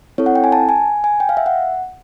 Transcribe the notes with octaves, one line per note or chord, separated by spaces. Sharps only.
C4 E4 A4 C#5
F#5
G5
G#5
A5
G#5
G#5
G5
F5
E5
F#5